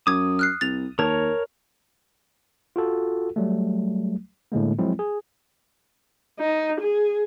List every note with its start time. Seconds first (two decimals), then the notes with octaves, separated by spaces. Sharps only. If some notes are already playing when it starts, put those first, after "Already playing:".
0.07 F#2 D6 D#6 G#6
0.39 F6 F#6 C7
0.61 C2 A6 F7
0.99 D#2 A#4 C#5 A5
2.76 F4 F#4 A4
3.36 F#3 G3 A3
4.52 A2 D3 G#3 A#3
4.79 F3 F#3 G#3 C4 E4
4.99 G#4
6.39 D#4
6.80 G#4